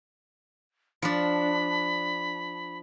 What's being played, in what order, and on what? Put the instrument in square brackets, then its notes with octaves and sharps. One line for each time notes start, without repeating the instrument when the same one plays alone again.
[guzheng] F3 D4 [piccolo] B5